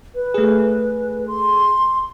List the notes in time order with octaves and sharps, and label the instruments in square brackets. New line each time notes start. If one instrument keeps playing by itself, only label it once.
[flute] B4
[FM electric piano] A3 G#4
[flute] C6